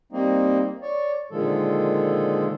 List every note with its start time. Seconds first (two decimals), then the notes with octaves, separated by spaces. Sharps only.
0.12 G3 A#3 C4 D#4
0.82 C#5 D5
1.31 A#2 D3 D#3 F3 G#3 A4